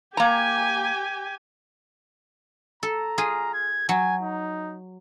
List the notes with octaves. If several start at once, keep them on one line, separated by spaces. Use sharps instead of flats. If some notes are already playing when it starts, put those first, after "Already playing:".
A#3 G4 G#5 A#5
A4 A#5
F4 G#4
G#6
F#3 G#5
D#4